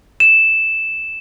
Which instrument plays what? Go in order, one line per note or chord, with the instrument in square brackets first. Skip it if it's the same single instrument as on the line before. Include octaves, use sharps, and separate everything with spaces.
[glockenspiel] E7